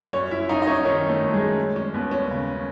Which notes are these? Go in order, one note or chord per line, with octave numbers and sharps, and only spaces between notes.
F#2 C#4 C#5
E4 E5
F#2 D#4 D#5
D#5
C#4 C#5
D#3 C#4 C#5
A3 A4
F#2
G#3 G#4
G#3
C#4
D#2 B3
C#4
C#3